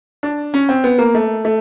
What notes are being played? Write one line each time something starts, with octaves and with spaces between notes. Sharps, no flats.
D4
C#4
C4
B3
A#3
A3
A3